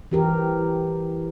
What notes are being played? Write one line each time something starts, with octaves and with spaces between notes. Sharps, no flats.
E3 G4 A#4